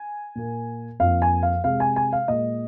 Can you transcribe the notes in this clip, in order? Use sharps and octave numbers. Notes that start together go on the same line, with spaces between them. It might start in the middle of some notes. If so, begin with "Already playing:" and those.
Already playing: G#5
A#2 A#3
F2 F3 A#3 F5
G#5
F5
C3 G#3 F5
G#5
G#5
F5
A#2 G#3 D#5